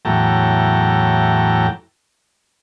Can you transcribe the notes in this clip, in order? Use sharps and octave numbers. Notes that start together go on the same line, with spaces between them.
E2 A2 F#3 G5 A5 A#5